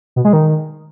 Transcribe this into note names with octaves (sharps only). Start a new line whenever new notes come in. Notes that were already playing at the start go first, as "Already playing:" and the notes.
B2
G#3
D#3